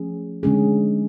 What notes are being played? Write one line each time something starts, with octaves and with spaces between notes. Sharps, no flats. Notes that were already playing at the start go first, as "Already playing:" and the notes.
Already playing: F3 A3 C#4 G#4
D3 G#3 C#4 G#4